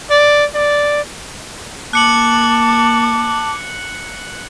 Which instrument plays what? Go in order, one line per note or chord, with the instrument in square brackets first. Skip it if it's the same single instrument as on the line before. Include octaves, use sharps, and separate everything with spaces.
[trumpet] D5
D5
[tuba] A#3 [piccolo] A5 [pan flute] D6 [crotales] F#6 C#7 F#7